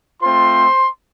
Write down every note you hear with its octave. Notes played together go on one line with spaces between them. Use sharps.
A3 C4 F4 C5 C6